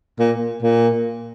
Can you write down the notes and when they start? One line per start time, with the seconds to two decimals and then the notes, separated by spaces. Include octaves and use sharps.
0.19 A#2
0.62 A#2